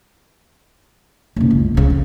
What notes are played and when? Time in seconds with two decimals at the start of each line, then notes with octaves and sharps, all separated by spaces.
1.36 F#1 B1
1.50 C#2
1.75 C#2 C#3
1.90 F2